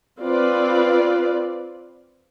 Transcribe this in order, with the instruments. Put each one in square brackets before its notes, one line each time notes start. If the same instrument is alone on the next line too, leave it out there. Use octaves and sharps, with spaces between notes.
[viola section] C4 F4 B4 D5